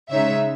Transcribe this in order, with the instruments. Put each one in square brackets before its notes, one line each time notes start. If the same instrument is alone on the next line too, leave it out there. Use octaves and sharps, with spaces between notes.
[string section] C#3 G#3 D#4 C#5 E5